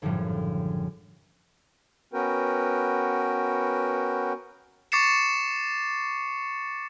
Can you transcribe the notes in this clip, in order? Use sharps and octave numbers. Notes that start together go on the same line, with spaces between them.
G#1 F#2 A2 D3 F3 G3
B3 C#4 F#4 A#4 B4 G5
C#6 D6 A6 C7 C#7 E7